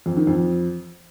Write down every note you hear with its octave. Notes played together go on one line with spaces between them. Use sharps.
F2
D#3
F2